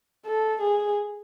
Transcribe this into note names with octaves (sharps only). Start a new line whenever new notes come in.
A4
G#4